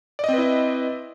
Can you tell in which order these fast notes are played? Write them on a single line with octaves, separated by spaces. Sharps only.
D5 D#5 C4 B4 E4